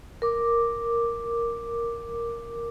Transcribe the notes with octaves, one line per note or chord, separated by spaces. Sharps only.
A#4 D6